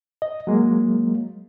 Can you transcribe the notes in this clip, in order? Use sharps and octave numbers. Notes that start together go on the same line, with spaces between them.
D#5
F#3 G#3 A#3